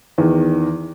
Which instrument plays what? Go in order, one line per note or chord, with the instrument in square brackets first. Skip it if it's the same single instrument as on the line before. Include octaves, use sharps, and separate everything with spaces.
[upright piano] E2 D#3